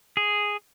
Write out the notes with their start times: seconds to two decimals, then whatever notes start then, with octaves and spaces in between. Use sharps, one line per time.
0.17 G#4